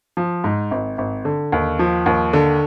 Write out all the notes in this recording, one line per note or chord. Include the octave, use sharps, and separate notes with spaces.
F3
G#2
G#1
G#1
D3
D#2
F3
D#2
D3